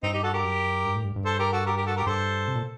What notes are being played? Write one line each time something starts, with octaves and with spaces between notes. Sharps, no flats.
G2 C4 D#4
D#4 G4
F#4 A4
G4 A#4
F#2
G2
A2
G2
G2
A4 C5
G4 A#4
F#4 A4
G4 A#4
G4 A#4
F#4 A4
G4 A#4
G2 A4 C5
C3
A#2